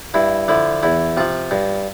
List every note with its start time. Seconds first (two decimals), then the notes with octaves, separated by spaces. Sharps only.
0.14 G2 E4
0.48 D3 F3 E4
0.83 E2 E4
1.17 C3 F3 F4
1.51 G2